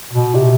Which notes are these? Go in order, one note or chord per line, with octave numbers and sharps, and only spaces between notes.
B2
C3